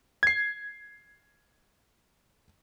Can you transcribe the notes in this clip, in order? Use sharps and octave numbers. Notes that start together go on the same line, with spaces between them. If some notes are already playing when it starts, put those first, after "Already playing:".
G#6 C7